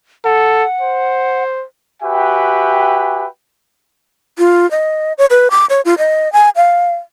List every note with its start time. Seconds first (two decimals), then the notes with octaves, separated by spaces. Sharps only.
0.25 A4 F#5
0.81 C5
2.02 F#4 G4 B4 E5 G5 G#5
4.38 F4
4.71 D#5
5.18 C#5
5.30 B4
5.51 D6
5.70 C#5
5.85 F4
5.98 D#5
6.33 G#5
6.56 F5